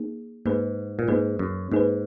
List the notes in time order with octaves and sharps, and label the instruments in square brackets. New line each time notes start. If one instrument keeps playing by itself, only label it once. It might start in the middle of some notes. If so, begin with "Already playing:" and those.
Already playing: [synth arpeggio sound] A#3 D#4 G#4
[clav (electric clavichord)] G#2 [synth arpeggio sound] A#3 D#4 G#4 B4
[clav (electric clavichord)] A#2
[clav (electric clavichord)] G#2 [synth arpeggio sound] A#3 D#4 G#4 B4
[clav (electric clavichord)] F#2
[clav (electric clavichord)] G#2 [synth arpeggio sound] A#3 D#4 G#4 B4